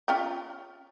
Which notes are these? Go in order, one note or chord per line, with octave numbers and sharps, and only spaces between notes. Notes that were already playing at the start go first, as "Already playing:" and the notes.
C#4 F4 G5